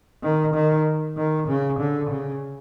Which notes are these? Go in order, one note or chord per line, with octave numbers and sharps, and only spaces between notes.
D#3
D#3
D#3
C#3
D3
C#3